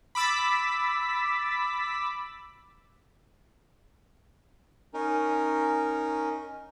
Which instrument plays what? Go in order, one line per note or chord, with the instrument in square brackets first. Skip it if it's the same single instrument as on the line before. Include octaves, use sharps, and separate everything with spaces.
[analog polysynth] B5 D6 E6 A6 B6
[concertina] C#4 D#4 A#4